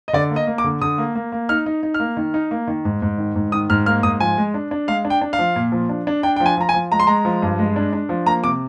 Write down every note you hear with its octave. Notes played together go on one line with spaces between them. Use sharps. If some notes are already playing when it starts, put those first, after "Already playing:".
D#5
D3 D5
A#3
D#5
A#3
D6
D3
D3 D#6
A#3
A#3
A#3
D#4 F6
D#4
D#4
F6
A#3
D#3
D#4
A#3
D#3
G#2
G#2
D#3
G#2
D#3 D#6
G#2 F6
A#3 F6
G#2 D#6
F3 G#5
G#3
D4
D4
G#3 F5
D4
G5
D4
F5
F3
A#2
F3
D4
D4
D4 G5
F3 G5
G#5
F3 A#5
G#5
F3
G#3 A#5
C6
G#3 A#5
F3
G2
G#3
D4
D4
F3
A#3 A#5
C3 D6